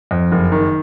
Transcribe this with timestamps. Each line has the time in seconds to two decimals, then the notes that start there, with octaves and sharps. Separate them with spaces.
0.11 F2
0.32 F#1
0.52 D#3